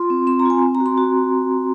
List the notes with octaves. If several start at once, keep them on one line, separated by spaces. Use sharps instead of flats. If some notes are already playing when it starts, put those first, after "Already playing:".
Already playing: F4 C6
C4
C4 C6
A#5
F4 G#5
C4
A#5
F#4
C6
F#4